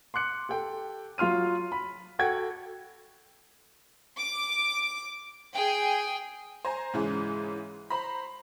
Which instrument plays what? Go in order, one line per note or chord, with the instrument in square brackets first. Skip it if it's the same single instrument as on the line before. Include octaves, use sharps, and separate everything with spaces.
[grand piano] C6 D6 F#6 C#7
G4 A4 G5
F#3 F4 C6 F6 D#7
B5
F#4 A4 F#5 G5 G#6
[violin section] D6
G#4 G5
[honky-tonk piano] C5 G#5 A#5
G#2 C#3 E3 G#3
C5 A#5 B5